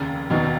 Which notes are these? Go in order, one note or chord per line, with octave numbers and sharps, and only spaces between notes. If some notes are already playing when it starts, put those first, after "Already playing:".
Already playing: F1 D#2 C#3
F1 D#2 B2 D#3